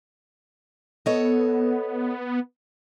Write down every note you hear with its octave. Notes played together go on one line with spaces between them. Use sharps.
B3 A4 C#5 D#5